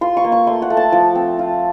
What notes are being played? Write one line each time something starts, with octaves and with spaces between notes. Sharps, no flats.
F4 C6
C#6
A#3
C#6
A3 C6
F#5
A3
A5
F3
C4
F4